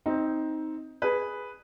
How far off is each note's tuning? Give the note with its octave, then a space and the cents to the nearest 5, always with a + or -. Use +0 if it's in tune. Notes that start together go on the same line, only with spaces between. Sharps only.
C4 +0 D#4 +10
G#4 +0 B4 +0